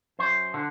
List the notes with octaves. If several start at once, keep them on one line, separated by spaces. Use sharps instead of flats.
F#2 C5
D3